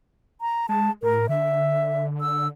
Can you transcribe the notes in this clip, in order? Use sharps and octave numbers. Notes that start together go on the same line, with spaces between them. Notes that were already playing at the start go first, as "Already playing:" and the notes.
A#5
G#3 A5
A2 A#4
D3 E5
E6